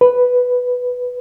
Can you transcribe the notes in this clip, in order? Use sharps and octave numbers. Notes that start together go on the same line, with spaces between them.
B4